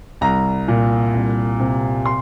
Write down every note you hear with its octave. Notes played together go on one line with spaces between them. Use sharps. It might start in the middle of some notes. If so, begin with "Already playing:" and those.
C2 A#5
A#2
C2
C3
C6